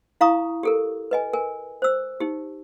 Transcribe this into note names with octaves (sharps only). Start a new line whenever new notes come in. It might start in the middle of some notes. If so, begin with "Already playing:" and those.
E4 F5 A#5 C#6 D#6
G4 A4 A#4
B4 D#5 G#5
A#4 G#5
C5 E6
D#4 G4